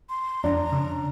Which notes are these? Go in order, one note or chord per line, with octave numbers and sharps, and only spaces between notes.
C6
F2 D4 A#5
C#3 C#4